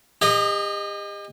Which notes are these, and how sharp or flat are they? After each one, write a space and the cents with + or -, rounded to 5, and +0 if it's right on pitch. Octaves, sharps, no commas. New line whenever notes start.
G4 +45 D#5 -15